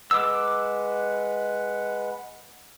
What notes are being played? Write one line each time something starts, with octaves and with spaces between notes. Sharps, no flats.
G#3 B4 F#5 D6 E6